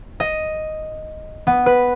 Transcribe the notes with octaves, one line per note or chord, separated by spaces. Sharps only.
D#5
B3
B4